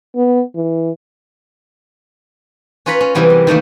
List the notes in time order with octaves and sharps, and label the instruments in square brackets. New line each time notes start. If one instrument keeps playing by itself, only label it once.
[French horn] B3
E3
[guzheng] C#4 F4 B4 C#5 A#5 B5
C#4
C3 E3 F#3 G3 B3
A#4
D#3 G3 A3 A#3